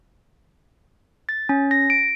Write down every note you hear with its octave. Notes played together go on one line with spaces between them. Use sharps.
A6
C#4
A#6
D7